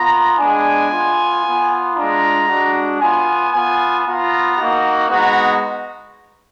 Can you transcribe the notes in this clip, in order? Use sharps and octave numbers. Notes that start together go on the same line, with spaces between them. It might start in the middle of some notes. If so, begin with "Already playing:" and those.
Already playing: B3 F4 A#5
G#3 B3 D4 G#5
B3 F4
B3 F4
G#3 D4 F4 A#5
G#3 D4 F#4
B3 F4 G#5
B3 F4 G#5
B3 F4 A#5
A#3 D#4 F#4
G#3 B3 D#4 F#4 A#5